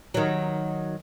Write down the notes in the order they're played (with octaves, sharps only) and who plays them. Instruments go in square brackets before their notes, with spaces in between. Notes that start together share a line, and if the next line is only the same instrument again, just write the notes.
[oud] D#3 F#3